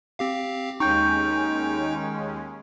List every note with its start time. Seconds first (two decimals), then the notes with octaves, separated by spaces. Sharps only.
0.19 C4 G4 F5
0.80 D#2 G#3 C#4 D#4 G5 C#6 G6